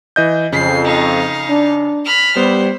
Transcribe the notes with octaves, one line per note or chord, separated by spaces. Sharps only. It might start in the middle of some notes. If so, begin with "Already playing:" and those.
E3 D#5 G6
F2 C#3 C7
D#4 F5
D4
B5 F6
G3 B3 C5